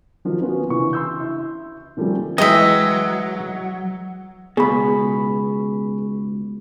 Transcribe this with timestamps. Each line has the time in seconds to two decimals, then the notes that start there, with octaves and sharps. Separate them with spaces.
0.25 D#3 F3 F#3
0.41 A#3 B3 C#4 F4 F#4
0.70 C#3 E3 D4 C#6
0.93 C6 E6 G6
1.20 E4 E5
1.97 D#3 F3 G3 A3 A#3 C#4
2.38 E3 F#3 G#3 D#5 E5 G5
4.57 C#2 B2 G#4 B5